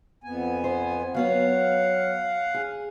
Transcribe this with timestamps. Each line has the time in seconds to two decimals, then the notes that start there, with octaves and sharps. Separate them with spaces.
0.24 F2 B3 G#5
0.64 C5
1.14 F#3 B3 C#5 F5 F#5
2.54 G#4